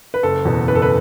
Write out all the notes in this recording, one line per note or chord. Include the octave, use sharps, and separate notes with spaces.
B4
F#1 A4
E2 B2
F#1 B4
A4
B4